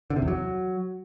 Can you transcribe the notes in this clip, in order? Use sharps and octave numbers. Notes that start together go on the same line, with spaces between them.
D3
C3
E2
F#3